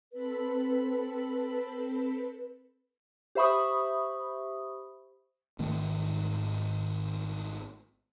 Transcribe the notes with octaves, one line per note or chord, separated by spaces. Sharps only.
C4 A4 B4 B5
G4 C5 E5 B5 C#6 D#6
G#1 G#2 D#3 A3